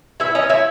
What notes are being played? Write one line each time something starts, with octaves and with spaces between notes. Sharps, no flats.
E4 E5
C#4 D#5
E4 E5